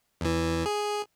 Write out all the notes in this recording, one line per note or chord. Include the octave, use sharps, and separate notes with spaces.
E2 E3
G#4